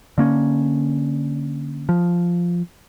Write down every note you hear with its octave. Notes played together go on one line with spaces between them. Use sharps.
D3 A#3 C#4
F3